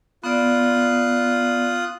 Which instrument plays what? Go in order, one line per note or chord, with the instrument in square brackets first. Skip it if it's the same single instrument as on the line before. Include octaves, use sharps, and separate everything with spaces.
[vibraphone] B3 D5 [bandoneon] F4 D#6 F#6